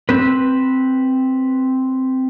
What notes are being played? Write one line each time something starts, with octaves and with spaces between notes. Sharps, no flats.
C4 B4